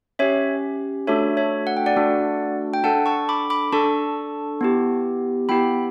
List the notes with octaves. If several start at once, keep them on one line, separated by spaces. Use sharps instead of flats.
C#4 G4 C#5 E5
A3 D4 F#4 A4 C#5 E5
C#5 E5
F#5
G5
D5 F#5
A3 D4 F#4 A4
G5
D4 A4 F#5 A5
A5 C#6
B5 D6
B5 D6
D4 A4 A5 C#6
B3 E4 G4
B3 E4 G4 G5 B5